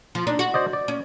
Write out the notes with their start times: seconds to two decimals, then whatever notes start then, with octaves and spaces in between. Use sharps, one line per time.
0.15 F3
0.27 D4 D#4
0.39 F#4
0.54 C5 D5 D#5
0.73 D5
0.88 C#4